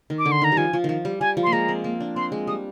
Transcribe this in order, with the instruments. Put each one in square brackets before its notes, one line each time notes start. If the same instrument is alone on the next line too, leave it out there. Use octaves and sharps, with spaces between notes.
[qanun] D#3
[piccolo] D6
[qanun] D3
[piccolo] C6
[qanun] D#3 [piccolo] A#5
[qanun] G3
[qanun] F3 [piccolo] G#5
[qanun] F3
D#3 F3
G3
[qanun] G3 [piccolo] G#5
[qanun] F3
[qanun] A#3 [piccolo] C6
[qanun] G#3 [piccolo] A#5
[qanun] C4
A#3
D4
[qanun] C4 [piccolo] C6
[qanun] G#3
[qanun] G3 [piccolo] D#6